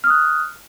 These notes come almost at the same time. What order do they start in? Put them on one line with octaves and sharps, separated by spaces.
F6 D#6 F#6